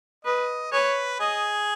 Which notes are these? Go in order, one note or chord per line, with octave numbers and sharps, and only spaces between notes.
B4 D#5
G#4 B4 C#5
G#4 D#5